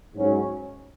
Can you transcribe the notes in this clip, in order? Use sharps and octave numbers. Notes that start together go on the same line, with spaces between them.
G#2 F#3 C#4